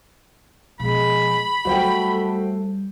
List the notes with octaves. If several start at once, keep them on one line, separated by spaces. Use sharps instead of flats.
B2 F3 G#3 B5
F#3 G3 A3 F#4 C5 G5